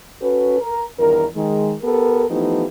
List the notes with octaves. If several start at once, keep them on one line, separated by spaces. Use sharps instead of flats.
C#4 F#4 A4 B4
A#4
E2 G2 D#3 A#4
D#3 G#3
B3 G4 A4 A#4
E3 F3 A3 B3 D#4 G4